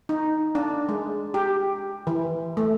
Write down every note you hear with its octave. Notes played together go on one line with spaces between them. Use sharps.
D#4
D4
G#3
G4
E3
A3